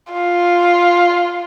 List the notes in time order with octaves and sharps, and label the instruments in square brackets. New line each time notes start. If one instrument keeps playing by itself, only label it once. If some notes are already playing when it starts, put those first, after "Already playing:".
[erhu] F4